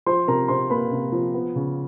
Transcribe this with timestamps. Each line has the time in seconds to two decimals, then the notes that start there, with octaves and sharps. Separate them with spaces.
0.06 F3 C5 C6
0.28 C3 A#4 A#5
0.48 C3 C5 C6
0.70 A#3 B4 B5
0.92 C3
1.12 F3
1.34 B3
1.55 C#3